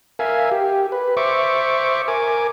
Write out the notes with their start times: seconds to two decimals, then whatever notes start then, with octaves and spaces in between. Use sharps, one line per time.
0.19 A#4 E5 F5 G#5
0.52 G4
0.92 B4
1.17 C5 E5 C#6 D6
2.08 A#4 G#5 D6